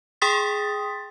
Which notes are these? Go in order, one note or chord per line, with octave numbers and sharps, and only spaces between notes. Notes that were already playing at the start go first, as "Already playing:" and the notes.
G#4 G5 C6 D#6 A6 B6